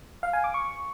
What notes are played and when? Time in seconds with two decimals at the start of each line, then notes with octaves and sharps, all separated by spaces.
0.23 F5
0.33 G#5
0.44 D6
0.54 C#6